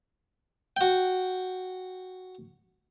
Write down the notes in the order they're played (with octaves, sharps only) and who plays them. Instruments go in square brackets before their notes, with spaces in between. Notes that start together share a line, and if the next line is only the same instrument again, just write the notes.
[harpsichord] F#4 G5